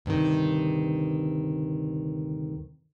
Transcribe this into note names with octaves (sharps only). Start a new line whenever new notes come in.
D2 G2 C3 D#3